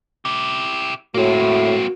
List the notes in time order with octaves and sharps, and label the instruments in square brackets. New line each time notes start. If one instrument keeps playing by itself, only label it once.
[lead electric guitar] E4 G4
[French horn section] A2 [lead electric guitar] A#3 C4 [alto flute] F#4